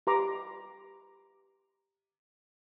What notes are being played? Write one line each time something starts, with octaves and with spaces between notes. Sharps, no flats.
G4 B4 A#5 C6 D6